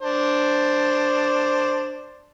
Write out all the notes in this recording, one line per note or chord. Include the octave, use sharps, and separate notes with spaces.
D4 C5